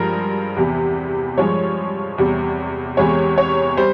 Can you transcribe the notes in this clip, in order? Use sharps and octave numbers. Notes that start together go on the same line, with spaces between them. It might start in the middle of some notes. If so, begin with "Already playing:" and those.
Already playing: G2 F3 G#3 A#4
E2 C3 E3
G2 F3 G#3 C#5
E2 C3 G3
E2 C3 E3 G#3 C#5
C#5
G3 C5